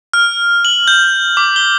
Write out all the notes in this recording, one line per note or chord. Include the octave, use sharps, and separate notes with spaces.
F6
F#7
G6
D6
G7